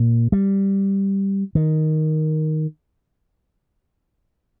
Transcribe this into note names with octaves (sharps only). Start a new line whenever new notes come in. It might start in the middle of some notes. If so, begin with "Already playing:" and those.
Already playing: A#2
G3
D#3